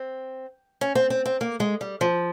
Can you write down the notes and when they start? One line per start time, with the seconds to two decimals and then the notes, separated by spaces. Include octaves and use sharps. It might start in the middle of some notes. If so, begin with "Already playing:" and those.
Already playing: C4
0.81 C#4
0.95 C4
1.10 C4
1.26 C4
1.41 A#3
1.60 G#3
1.81 G3
2.01 F3